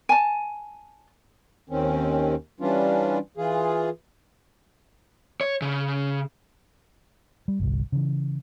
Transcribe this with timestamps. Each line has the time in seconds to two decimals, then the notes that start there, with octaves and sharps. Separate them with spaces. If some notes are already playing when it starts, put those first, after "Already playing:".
0.09 G#5 A5
1.70 D#2 D#3 C4 C#4
2.60 E3 G3 C#4 D4 F4
3.37 E3 F4 G#4
5.41 C#5
5.62 C#3
7.48 G3
7.59 G1 C2
7.92 C#3 E3